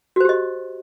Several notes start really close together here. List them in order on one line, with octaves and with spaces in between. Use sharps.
F#4 C5 G4 D#5